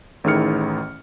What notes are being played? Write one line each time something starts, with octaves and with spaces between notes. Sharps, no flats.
A1 A2 D#3 G#4 F6 C#7